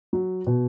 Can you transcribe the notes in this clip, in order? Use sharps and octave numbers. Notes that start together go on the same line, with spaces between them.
F#3
B2